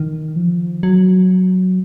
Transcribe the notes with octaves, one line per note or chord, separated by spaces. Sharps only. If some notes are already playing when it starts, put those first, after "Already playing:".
Already playing: D#3
F3
F#3